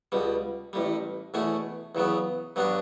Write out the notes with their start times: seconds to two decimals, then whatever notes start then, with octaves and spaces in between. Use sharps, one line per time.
0.12 C#2 B2 G3
0.73 A1 A2 G3
1.34 E2 B2 A3 C#4
1.95 E2 C#3 F#3 B3
2.56 G2 F#3 B3 D4